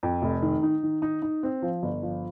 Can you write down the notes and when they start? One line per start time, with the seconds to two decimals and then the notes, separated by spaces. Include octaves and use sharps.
0.03 F2
0.22 F1
0.42 D#3
0.63 D#4
0.83 D#3
1.02 D#4
1.22 D#4
1.43 C4
1.62 F3
1.83 G1
2.03 F3